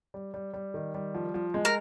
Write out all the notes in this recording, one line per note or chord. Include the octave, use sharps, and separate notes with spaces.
G3
G3
G3
D#3
G3
F3
F3
G#3
A#4